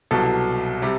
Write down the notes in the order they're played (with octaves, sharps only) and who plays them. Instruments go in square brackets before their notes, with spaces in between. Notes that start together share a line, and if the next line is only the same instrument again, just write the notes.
[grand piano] C2 B2 F#3 A4
C3 G3